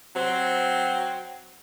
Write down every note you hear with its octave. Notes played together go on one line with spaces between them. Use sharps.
F#3 C4